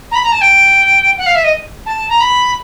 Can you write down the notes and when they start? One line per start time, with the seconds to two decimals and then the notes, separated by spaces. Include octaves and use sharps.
0.11 A#5
0.15 B5
0.24 A#5
0.32 A5
0.41 G5
1.18 F#5
1.26 F5
1.35 E5
1.44 D#5
1.86 A5
2.09 A#5
2.20 B5